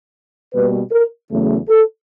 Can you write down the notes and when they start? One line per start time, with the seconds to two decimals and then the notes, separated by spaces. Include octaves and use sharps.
0.53 B2 G3 A#3 B4
0.91 A#4
1.30 E2 C#3 F#3 A3
1.68 A4